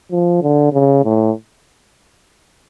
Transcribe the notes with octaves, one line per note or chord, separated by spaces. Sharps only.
F3
D3
C#3
A2